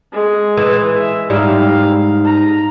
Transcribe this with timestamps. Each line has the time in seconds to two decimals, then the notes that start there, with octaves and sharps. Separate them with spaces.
0.12 G#3 G#4
0.57 E3
0.97 E5
1.30 G#2 G3 E4 F5
2.25 A#5